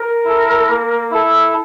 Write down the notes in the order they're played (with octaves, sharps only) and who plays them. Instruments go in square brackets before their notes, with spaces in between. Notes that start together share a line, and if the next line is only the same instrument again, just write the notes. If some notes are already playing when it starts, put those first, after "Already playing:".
Already playing: [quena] A#4
[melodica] E4 A4
A#3
E4 A4